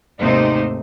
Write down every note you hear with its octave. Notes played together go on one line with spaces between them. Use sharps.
D#2 G#2 C3 A3 D#4 C5